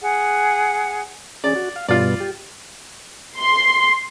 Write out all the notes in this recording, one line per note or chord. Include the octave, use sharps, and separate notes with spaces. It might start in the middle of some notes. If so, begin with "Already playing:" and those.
G#4 F#5
C#4 G#4 D5
F#4
F5
G2 B2 F4 D5
G4
C6